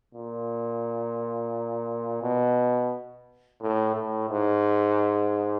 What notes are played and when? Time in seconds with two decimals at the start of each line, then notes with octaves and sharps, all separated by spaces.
0.15 A#2
2.22 B2
3.61 A2
3.95 A2
4.30 G#2